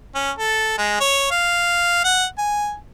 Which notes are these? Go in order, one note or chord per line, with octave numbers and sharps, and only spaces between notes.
C#4
A4
G#3
C#5
F5
F#5
G#5